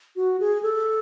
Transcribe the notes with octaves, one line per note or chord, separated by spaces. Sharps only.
F#4
G#4
A4